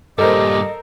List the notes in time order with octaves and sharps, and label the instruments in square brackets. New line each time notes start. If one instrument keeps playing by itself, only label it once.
[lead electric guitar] G2 A#2 [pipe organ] G4 D6 [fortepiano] A4 A#4 C5 [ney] D#5